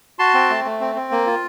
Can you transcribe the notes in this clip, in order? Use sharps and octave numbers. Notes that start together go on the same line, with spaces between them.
F#4 A5 C6
C4
A3
A3
C4
C4
A#3
F4